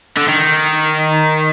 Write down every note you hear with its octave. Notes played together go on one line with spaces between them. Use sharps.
D3
D#3